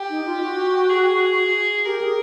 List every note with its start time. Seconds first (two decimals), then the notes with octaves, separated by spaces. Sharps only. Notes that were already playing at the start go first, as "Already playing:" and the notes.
Already playing: G4
0.10 D#4
0.26 F4
0.41 F#4
0.89 G#4
1.85 G4 A#4
2.02 G#4